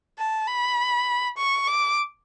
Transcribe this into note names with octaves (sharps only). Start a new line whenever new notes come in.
A5
B5
C#6
D6